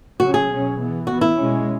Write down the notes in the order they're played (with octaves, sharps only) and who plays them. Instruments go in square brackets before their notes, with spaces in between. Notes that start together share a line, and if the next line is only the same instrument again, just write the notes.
[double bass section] C#3 F#3 C#4 [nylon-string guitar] F#4
[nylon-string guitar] G#4
[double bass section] B2 F#3 C#4
E3 B3
[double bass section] E3 B3 [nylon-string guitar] F#4
[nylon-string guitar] E4
[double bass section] B2 G#3 C#4